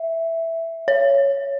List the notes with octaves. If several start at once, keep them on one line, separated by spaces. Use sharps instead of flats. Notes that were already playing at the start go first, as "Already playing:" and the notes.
Already playing: E5
C#5